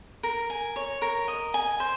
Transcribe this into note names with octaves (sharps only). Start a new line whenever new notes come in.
A#4
G#5
C#5
A#4
D#5
G#5
C5